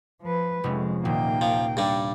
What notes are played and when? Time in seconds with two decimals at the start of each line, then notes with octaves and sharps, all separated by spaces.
0.22 F3 B4
0.64 F1 G#3 C#4
1.05 D#1 A#3 G5
1.41 F3
1.77 G2 G3